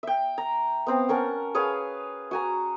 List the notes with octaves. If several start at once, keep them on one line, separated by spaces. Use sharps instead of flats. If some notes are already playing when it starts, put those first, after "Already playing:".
E5 G5
A#5
B3 C4 F5
C#4 A#4 F#5 A5
G#4 B4 C#5 F5
F#4 G#5 A#5